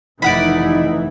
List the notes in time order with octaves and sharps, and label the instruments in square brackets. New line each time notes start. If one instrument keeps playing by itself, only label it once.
[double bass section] F1 D#3 E3 [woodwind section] D#4 E4 [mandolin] D5 F#5 B5